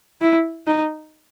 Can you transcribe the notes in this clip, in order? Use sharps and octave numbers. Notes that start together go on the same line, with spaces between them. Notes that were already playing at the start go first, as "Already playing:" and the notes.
E4
D#4